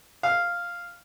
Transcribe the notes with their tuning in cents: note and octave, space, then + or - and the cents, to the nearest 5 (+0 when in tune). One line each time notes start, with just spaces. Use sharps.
F5 -5